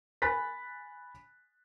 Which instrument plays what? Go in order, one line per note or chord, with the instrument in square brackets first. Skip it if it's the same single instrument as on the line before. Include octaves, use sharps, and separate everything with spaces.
[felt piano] G#5 B5 F#6 A6 B6